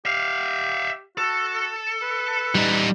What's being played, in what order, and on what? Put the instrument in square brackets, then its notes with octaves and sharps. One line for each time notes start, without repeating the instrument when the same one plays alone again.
[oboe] G4 [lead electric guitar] E5 F5
[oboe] F#4 [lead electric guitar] A4
[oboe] B4
[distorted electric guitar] G3 D#4